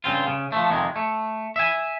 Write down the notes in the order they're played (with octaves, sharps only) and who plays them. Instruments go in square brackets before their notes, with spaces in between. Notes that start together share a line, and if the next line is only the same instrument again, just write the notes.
[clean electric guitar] G2 C#3 C4 F4
C#3
F3 A3
F2 C3 D#3 G#3
A3
E5 G#5